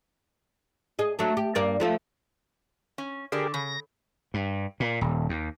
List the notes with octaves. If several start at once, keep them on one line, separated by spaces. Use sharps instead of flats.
G#4 D#5
F#3 A3 D4
G4
G2 A#3 D5
F3 A3 F4
C#4
D3 G4 G#4 A#4 D5
C#3 A#6
G2
A#2
D#1
D#2